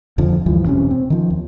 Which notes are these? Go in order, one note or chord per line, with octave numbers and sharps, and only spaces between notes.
D#1 F2 D3 F3
D2 G2 E3 F3
E1 C3 C4 C#4
C4
D#3 F3
D#2